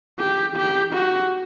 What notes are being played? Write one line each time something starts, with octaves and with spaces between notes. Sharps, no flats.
G4
G4
F#4